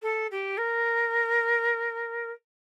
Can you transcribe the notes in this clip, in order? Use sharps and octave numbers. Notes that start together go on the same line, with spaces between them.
A4
G4
A#4